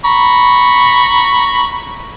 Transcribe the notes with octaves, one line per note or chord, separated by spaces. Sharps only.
A#5 B5 C#6